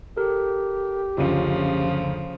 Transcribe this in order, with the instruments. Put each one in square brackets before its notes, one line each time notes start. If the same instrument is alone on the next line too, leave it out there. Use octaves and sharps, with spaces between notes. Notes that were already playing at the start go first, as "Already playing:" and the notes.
[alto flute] G4 [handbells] A4 A#4
[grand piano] F#1 D2 [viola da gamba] C#3 F3 [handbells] F4